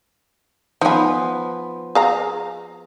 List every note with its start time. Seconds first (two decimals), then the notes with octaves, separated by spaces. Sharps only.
0.81 F3 B3 D#4 G#5
1.95 G#4 F5 A#5